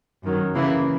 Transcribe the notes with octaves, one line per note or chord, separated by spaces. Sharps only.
F#2 D#3 F#3
C#3 E3 A#3 E4